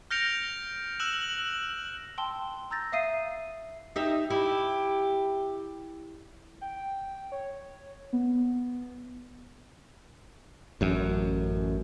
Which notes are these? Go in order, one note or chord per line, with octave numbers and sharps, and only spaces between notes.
F6 G6 A#6 C#7 D7 F7
E6 F#6 E7 F#7
G5 A5 C6 E6 G7
A#5 E6 G6 A6 A#6
E5 F5 D#6 C7 D#7
D#4 G4 E5
E4 G4
G5
C#5
B3
A1 F#2